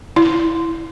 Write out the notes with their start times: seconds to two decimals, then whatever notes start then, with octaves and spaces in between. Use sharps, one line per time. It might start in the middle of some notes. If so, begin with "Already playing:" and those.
0.16 E4